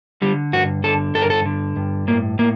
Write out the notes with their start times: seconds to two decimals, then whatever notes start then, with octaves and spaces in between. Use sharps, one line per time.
0.22 D3 G3
0.53 G2 F#4
0.84 D3 A4
1.14 G2 A4
1.22 A#4
1.30 A4
1.46 D3
1.77 G2
2.08 A2 A#3
2.39 A2 A#3